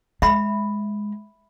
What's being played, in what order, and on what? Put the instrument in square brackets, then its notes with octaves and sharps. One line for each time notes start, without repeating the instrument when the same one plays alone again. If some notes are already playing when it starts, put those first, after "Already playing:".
[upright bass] G#3 [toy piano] E5 B5